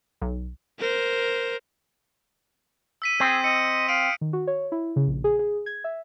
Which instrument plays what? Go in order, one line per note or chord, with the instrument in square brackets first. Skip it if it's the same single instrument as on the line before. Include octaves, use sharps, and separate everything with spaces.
[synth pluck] B1
[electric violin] A#4 C5
[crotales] E6 B6 D#7
[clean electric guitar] C4 [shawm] G#4 [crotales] G6
[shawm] D#5 [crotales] C#7
[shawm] F5 [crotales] D#6 D7 D#7
[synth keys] D#3
F#4
C#5
E4
C#3
A#1
G#4
G#4
G#6
E5